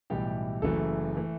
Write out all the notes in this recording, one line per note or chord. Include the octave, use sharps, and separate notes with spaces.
B1 A2 E3 G3 G4
F#1 F#2 E3 A3 A4
E3 A3